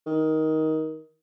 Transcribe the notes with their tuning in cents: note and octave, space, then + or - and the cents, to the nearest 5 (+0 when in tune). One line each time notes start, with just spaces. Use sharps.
D#3 +15